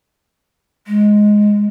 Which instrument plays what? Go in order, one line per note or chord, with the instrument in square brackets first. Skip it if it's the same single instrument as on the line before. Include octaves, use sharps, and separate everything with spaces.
[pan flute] G#3